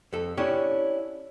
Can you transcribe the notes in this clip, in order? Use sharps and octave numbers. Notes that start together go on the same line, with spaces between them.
F2 A4
C#4 D4 E4 G4 C#5